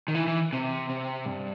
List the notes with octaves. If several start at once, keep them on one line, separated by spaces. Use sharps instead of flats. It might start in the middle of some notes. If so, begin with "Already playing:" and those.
D#3
E3
E3
C3
C3
G2